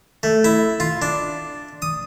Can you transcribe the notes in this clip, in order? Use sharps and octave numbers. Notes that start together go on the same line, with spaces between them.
A3
E4
F4
D4
D#6